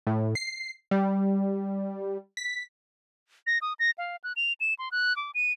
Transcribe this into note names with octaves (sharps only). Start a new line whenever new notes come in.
A2
C7
G3
B6
A#6
D#6
A#6
F5
F#6
F7
E7
C6
F#6
D6
D#7